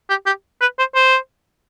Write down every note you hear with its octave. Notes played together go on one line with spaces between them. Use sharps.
G4
G4
B4
C5
C5